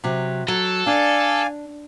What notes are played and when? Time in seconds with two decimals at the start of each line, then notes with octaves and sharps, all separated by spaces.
0.04 C3 F#3
0.48 F#3 A4
0.87 D4 D5 F5 G#5